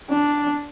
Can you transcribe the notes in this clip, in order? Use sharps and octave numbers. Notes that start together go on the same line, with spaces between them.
D4